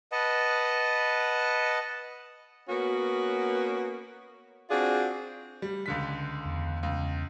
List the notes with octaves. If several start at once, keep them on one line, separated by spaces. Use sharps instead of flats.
B4 D#5 F#5 A5
A#3 B3 C#4 F#4
C4 D4 F4 F#4 G#4
G3
C#2 D3 B6
E2
C#2